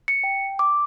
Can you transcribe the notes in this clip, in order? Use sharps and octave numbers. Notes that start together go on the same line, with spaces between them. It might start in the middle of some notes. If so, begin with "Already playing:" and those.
C#7
G5
D6